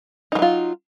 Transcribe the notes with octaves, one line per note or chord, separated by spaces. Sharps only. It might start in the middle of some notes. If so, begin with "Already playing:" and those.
F3 F#3 D#4 F4